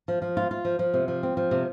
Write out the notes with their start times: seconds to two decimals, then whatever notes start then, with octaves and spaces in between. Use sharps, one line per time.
0.08 F3
0.22 F3
0.37 F4
0.51 F4
0.65 F3
0.79 F3
0.94 C3
1.08 F3
1.23 C4
1.37 F3
1.51 C3